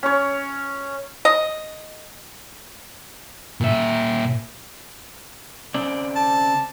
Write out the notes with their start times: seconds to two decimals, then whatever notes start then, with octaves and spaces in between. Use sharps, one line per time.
0.03 C#4 C#5
1.25 D#5
3.61 A#2 E5
5.74 C#3 C4 D5
6.16 A5